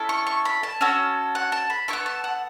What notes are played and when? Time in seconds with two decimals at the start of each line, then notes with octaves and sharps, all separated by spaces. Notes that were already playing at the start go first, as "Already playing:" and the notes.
Already playing: C#4 E4 A4
0.09 C#6
0.27 C#6
0.45 B5
0.63 A5
0.81 C#4 F#4 A4
1.35 F#5
1.52 A5
1.70 B5
1.88 E4 A4 C#6
1.93 B3
2.06 A5
2.24 F#5